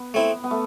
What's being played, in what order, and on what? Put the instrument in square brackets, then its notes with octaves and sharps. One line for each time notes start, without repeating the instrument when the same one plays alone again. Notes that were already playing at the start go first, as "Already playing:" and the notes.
Already playing: [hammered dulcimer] B3
[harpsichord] A3 C4 E4
[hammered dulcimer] B3
A3